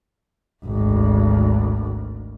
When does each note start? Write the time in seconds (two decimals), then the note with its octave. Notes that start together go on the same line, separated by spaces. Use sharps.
0.65 G#1 D2